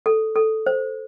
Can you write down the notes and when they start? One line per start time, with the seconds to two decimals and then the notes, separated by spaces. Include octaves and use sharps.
0.06 A4
0.35 A4
0.66 C5